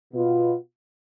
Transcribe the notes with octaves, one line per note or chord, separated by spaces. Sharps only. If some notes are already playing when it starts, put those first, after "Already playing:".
B2 B3 F4